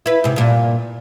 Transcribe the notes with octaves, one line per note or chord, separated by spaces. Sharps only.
E4 B4
G#2 C3
G2 A#2